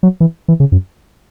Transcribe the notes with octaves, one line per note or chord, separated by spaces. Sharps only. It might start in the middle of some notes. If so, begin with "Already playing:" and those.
F#3
E3
E3
C#3
F#2